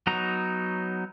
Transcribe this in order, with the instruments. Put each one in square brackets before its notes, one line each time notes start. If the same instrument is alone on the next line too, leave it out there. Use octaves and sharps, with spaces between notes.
[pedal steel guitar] F#3 B3 D#4 C#5 A#5